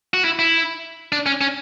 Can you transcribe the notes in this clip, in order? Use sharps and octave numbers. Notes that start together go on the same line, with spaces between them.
F#4
E4
E4
D4
C#4
C#4